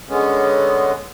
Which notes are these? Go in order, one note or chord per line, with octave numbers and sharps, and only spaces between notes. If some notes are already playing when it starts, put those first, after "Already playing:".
D3 G#3 B3 C#4